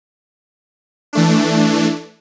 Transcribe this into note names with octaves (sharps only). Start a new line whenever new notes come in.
E3 A3 D4